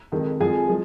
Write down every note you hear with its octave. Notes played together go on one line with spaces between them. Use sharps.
F2 D#3 G#3
F2 F3 G#3 G#4 G#5
F3 G#3